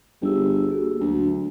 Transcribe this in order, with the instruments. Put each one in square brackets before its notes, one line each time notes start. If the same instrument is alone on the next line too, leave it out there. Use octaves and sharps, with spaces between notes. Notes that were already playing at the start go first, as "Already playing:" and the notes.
[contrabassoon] G1 [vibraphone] G4 G#4 E6
[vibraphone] A#3 F#4 A4
[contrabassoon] D2 [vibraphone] F#3 A3